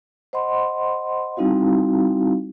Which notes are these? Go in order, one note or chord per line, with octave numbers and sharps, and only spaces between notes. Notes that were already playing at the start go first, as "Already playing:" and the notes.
C5 D#5 F#5 B5 C6
G3 C4 D#4 E4 F#4 F5